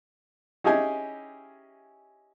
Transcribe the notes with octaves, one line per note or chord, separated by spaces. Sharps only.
C#4 D#4 E4 G4 G#4 G#5